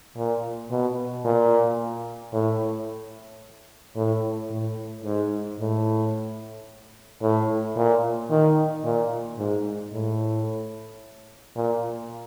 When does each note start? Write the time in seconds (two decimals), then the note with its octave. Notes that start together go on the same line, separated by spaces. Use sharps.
0.17 A#2
0.71 B2
1.25 A#2
2.33 A2
3.96 A2
4.51 A2
5.05 G#2
5.60 A2
7.22 A2
7.76 A#2
8.30 D#3
8.84 A#2
9.39 G#2
9.93 A2
11.56 A#2